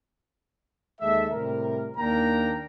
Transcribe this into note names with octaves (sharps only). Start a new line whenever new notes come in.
D#2 G#3 A4 E5
A2 C3 G3 A#4
D#2 A#3 D4 A#4 G5 A#5